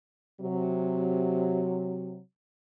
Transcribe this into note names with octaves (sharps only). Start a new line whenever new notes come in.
C3 F#3